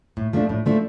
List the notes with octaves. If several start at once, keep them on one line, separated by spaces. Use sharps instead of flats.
A2
F3 A3 D4
A2
F3 A3 D4